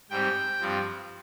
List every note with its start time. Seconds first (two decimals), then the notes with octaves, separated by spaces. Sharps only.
0.10 G#2 G3 C4 G5
0.61 G2 F3 C4